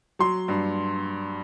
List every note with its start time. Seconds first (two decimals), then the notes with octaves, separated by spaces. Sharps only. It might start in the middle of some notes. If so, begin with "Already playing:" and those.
0.19 F#3 C6
0.48 G2